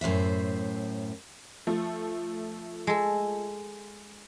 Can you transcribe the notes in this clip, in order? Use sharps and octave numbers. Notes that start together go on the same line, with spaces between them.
F#2 A2 C5 E5
F3 A3
G#3 A4